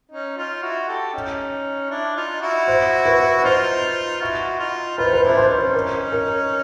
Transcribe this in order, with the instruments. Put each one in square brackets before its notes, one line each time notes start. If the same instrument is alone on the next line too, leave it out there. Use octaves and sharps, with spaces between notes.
[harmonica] C#4 D#4
D#4 F4
E4 F#4
G4 A4
C#4 D#4
D4 E4
D#4 F4
E4 F#4
[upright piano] C5
B4
[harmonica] D#4 F4 [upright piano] C5
[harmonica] E4 F#4
D#4 F4
[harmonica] D#4 F4 [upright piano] B4
[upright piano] C5
B4
[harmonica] D4 E4 [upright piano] C5
[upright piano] B4
C5
[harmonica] C#4 D#4 [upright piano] B4
[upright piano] A#4
A#4